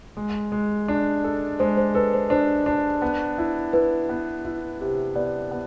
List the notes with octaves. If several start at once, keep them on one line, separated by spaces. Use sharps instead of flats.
G#3
G#3
D4
A4
G#3 C5
C5
A4 B4
C5
D4 C5
D4
B3
E4
E4 B4
B3
E4
C3
B3 D5
B3